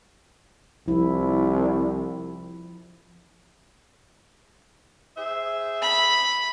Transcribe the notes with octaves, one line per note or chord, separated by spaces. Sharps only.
C2 F3 E4
G#4 C5 E5
B5